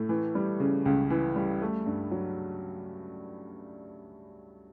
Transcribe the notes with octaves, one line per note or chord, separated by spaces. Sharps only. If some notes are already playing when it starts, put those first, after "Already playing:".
Already playing: A2 A3
E3
G3
C#3
C#2
E3
G3
A3
G2
F#3